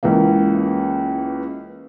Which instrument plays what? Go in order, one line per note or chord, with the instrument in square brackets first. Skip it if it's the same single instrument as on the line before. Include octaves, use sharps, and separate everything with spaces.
[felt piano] C#2 E3 A#3